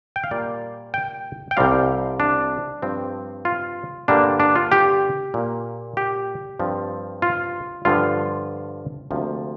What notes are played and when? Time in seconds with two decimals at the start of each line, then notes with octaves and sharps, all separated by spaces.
0.16 G5
0.24 F5
0.31 A#2 G3 A#3 D5
0.94 G5
1.51 G5
1.57 C2 C3 G3 C4 F5
2.20 D4
2.82 G2 F3 C4
3.45 F4
4.08 G2 D3 G3 A#3 D4
4.40 D4
4.55 F4
4.72 G4
5.34 A#2 A#3
5.97 G4
6.59 G2 F3 C4
7.22 F4
7.85 G2 D3 F3 F4
9.11 D2 C3 F3 A#3